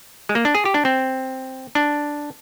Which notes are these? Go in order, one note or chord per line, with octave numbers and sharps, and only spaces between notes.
G#3
A#3
D4
G#4
G4
D4
C4
D4